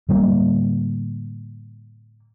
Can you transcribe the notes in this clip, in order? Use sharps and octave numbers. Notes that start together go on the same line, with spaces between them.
A2 D3 G3 A#3